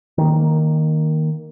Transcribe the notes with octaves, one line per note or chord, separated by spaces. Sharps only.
D#3 A#3